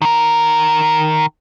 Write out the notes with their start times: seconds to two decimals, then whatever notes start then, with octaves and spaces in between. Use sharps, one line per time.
0.02 D#3 A#4